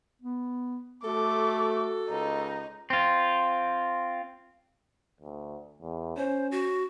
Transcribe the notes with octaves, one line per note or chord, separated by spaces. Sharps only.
B3
A3 F#4 A4 D6
C#2 D#4
C4 F4
D2
E2
C#4 C5
F#4